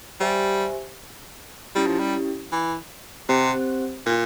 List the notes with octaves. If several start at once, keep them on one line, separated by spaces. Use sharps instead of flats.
G3 G4 C5 E5 G#5
G3 C#4 E4 G4
F3
G3
E3
C3 C4 G4 C5
A#2